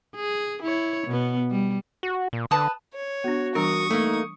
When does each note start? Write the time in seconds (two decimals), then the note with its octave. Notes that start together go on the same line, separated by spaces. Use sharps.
0.16 G#4
0.63 E4 C#5
1.07 B2 B3
1.51 G3
2.03 F#4
2.33 A#2
2.51 D3 B4 A5 D#6
2.94 C#5
3.24 B3 D4 F#4
3.55 E3 G3 D4 A#4 C#6 D#6
3.90 A3 A#3 D#4